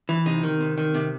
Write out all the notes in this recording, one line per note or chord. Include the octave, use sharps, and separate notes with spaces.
E3
C3 D#4
D#3
C3
D#3
C3